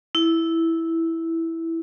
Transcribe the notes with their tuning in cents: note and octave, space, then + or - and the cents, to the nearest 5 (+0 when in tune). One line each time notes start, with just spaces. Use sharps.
E4 -5